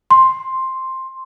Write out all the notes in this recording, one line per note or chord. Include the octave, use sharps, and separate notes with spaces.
C6